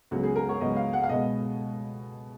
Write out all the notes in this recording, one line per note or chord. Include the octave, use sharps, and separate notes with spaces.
C#2 C#3 F#3 B3 F#4
G#4
A#4
C#5
C#2 C#3 F#3 B3 D#5
F5
F#5
F5
B2 G#3 B3 D#5